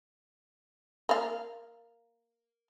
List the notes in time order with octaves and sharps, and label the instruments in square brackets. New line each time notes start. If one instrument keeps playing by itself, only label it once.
[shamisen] A#3 F5